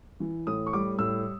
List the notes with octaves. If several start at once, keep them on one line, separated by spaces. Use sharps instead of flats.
E3
A2 D#6
C#6
G3 D6
A2 E6